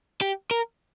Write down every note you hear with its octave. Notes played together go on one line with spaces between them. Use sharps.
G4
A#4